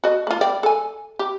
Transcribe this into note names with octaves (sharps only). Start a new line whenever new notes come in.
F#4 D#5
A3 F4
G3 D5 G5
A4 G#5
G4